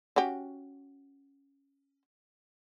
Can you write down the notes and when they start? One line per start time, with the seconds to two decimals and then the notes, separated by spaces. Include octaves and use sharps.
0.16 C#4 F#4 G4